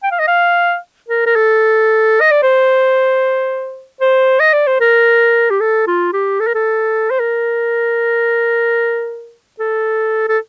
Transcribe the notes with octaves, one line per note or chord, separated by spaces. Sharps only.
G5
F5
D#5
F5
A#4
A#4
A4
D#5
D5
C5
C5
D#5
D5
C5
A#4
G4
A4
F4
G4
A4
A#4
A4
C5
A#4
A4
A4